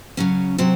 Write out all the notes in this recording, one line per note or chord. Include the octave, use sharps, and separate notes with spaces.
C#3 F#3 C#4
C3 F#3 C4